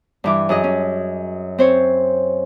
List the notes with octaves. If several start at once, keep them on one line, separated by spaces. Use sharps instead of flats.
G2 E3 D6
F#2 G#4 D#5
C#4
C4 C5 C#5